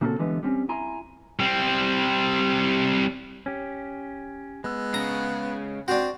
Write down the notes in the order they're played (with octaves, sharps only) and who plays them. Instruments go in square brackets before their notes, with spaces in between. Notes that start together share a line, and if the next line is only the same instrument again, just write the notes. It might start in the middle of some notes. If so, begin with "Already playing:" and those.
[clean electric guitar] A#2 C#3 A#3 C4 F#4 A4
D3 E3 G3 G#3 B3
G3 C4 C#4
E4 G#5 A#5 C6
[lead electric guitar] G3 C4
[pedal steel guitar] C#4 G4
[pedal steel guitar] G#3 E6 [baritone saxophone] B3
[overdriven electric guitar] C#3 [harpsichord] A#5
[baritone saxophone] C4 [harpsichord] D4 F#4